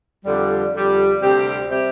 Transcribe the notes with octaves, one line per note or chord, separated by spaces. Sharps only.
F2 D3 G3
F2 D3 G3
D2 C3 G3 C4 G4
C3 G3 C4 G4